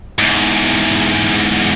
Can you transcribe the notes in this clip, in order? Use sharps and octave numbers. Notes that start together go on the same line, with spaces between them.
E2 G#2